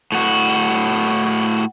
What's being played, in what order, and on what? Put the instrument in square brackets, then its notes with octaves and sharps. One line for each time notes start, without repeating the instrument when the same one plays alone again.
[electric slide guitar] A2 F#4